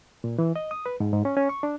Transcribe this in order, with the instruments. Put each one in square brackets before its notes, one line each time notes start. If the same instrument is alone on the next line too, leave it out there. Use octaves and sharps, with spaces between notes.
[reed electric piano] A#2
E3
D#5
D#6
B4
G#2
G#2
C#4
C#4
C#6
D4